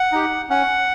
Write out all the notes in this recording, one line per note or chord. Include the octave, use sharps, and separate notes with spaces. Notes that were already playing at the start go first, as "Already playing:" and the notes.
Already playing: F#5
D#4 G4
C#4 F#5